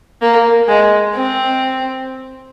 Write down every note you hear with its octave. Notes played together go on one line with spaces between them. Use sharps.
A#3
G#3
C4